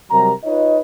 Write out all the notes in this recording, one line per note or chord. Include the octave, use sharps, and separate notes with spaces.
C3 F#3 G3 A#4 A#5
D#4 F4 B4 C#5 D#5